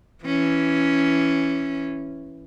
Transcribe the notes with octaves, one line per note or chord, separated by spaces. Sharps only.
E3 C#4